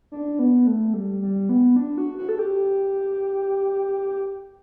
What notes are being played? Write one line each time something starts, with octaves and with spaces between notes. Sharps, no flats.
D4
B3
A3
G3
G3
B3
D4
F#4
F#4
A4
G4